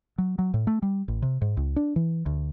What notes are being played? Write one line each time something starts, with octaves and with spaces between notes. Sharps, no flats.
F#3
F#3
A2
A3
G3
A1
C3
G#2
C#2
D4
E3
D2